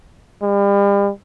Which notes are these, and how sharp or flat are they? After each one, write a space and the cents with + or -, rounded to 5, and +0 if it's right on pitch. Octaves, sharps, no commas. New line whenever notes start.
G3 +40